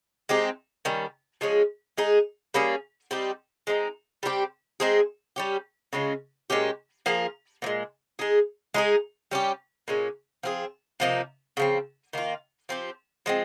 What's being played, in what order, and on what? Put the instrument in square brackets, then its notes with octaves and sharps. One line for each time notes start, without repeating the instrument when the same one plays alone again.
[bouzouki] G#3 C4 D#4 G4
D#3 G3 C#4
F3 G#3 C#4 G#4
G#3 D#4 G#4
G3 A#3 C#4 G#4
G3 C4 D#4 G4
G#3 C4 D#4
G3 C4 D#4 G4
G#3 C4 D#4 G#4
G3 C#4 G4
C#3 G#3 C#4 F4
A#2 G#3 C#4 G4
F3 A#3 F4 G#4
A#2 F3
G#3
G#3 D#4 G#4
G#3 D#4 G#4
G3 C#4 G4
A#2 G#3 C#4
F3 C4 F4 G#4
C3 F3 A#3 D#4
C#3 F3 C4
D#3 A#3 F4
F3 C4 G4
F3 G#3 C4